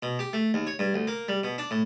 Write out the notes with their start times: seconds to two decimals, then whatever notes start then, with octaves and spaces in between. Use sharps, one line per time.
0.03 B2
0.19 G4
0.33 A3
0.54 D#2
0.67 C#5
0.79 G2
0.94 D2
1.07 A#3
1.28 G3
1.44 B2
1.58 D4
1.71 A2